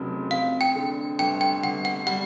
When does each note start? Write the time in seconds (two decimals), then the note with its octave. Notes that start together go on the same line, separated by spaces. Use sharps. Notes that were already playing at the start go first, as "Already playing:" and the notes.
Already playing: F1 F2 C#3 F#3
0.31 F2 F5
0.61 G5
0.75 D3
1.19 G1 G5
1.41 G5
1.63 G1 F#5
1.85 F#5
2.06 G3 F#5